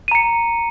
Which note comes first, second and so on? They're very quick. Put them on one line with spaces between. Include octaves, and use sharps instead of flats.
D#7 A#5 C#7